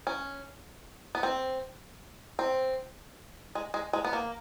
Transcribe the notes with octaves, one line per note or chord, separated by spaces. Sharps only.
C#4
B3
C4
C4
G#3
G#3
G#3
B3
A#3